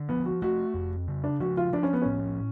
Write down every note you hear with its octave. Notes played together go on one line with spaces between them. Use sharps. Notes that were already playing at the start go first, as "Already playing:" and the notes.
Already playing: D3
F3 B3
F#4
A3 F#4
F2
C#3
D4
F3 F#4
F4
F3 D4
C#4
B3
A2 C#4